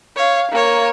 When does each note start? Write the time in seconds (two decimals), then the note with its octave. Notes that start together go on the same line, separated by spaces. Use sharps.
0.16 C#5 F5
0.51 A#3 C#5